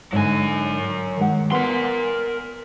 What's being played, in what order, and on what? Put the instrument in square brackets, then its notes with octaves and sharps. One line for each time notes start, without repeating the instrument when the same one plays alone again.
[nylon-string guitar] G#2 D3 [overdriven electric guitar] F#3 G#5
[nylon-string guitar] D#3 G#3 F#5
[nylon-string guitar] B3 F#5 [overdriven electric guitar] A#4 C6